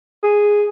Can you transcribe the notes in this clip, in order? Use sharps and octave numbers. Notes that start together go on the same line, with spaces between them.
G#4